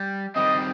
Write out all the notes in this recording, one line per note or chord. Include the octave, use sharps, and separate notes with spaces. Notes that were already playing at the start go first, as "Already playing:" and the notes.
Already playing: G3
D#3 G3 C4 D#5